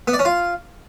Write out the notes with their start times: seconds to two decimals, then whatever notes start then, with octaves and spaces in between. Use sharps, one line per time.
0.08 B3
0.13 D5
0.19 C#4
0.25 F4